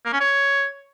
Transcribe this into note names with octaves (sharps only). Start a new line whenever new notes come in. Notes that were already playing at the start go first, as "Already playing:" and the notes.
A#3
C#4
C#5